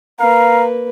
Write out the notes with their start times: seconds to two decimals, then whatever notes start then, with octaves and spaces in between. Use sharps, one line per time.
0.19 A#3 B4 F5 A#5